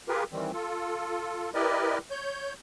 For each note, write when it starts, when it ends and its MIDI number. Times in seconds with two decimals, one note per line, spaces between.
0.08 0.24 65
0.08 0.24 67
0.08 0.24 68
0.08 0.24 70
0.08 0.24 71
0.32 0.51 51
0.32 0.51 52
0.32 0.51 55
0.32 0.51 60
0.53 1.50 65
0.53 1.50 69
1.54 1.98 64
1.54 1.98 67
1.54 1.98 70
1.54 1.98 71
1.54 1.98 74
1.54 1.98 75
2.11 2.53 73
2.11 2.53 91